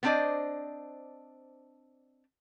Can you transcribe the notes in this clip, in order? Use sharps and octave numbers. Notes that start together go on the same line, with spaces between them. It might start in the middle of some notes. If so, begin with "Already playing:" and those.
B3 C4 D4 C5 D5 D#5